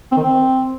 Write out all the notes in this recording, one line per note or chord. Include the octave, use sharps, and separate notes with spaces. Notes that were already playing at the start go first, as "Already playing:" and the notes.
C4
D#3
C4